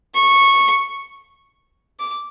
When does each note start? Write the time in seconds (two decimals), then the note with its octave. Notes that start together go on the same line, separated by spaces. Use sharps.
0.15 C#6
2.00 D6